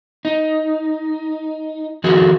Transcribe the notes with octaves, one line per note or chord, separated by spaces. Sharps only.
D#4
D#3 F3 A3 F#4 G#4 A#4